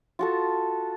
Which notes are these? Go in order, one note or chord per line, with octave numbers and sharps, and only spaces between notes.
F4 F#4 A4